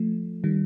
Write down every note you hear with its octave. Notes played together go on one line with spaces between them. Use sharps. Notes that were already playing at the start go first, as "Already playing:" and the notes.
Already playing: F3 A3
D#3 G3